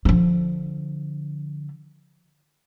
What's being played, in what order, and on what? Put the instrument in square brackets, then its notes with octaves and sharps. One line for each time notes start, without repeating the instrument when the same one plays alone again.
[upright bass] D3 F3